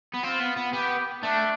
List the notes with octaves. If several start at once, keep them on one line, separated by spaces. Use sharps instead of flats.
B3
C4 F4
B3
B3
B3 G4
A3 D4